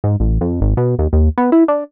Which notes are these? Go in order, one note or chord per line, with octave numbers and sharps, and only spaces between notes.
G#2
A1
F2
G#1
B2
D#2
D#2
B3
E4
D4